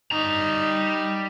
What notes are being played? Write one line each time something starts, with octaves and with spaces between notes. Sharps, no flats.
G3 D#4 A#5